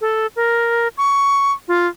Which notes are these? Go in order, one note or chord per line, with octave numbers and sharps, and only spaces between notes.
A4
A#4
C#6
F4